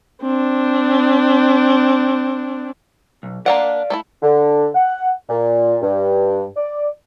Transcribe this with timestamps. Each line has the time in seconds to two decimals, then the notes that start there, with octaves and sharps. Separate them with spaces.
0.22 C4 D4
3.23 B1
3.46 A#3 D4 D5 F5 F#5
3.90 A3 D4 E4
4.22 D3
4.74 F#5
5.29 A#2
5.82 G2
6.56 D5